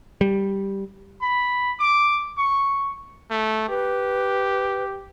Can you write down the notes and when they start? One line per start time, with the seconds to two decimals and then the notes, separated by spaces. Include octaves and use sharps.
0.21 G3
1.22 B5
1.80 D6
2.38 C#6
3.31 A3
3.69 G4 B4